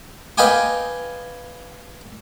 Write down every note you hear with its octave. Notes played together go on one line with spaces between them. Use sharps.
B4 D#5 F5 G5 G#5 D6